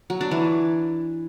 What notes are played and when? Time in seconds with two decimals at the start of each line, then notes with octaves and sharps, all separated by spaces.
0.10 F#3
0.21 D4
0.31 E3